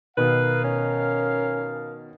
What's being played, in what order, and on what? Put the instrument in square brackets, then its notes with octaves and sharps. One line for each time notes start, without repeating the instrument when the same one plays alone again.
[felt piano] B2 D#3 [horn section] A#4 F5 [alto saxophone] B4
[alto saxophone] C#4